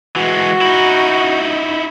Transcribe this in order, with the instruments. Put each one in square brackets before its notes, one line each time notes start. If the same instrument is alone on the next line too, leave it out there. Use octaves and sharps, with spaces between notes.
[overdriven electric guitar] E3 G#3 [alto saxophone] F#4
[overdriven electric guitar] D#4 E4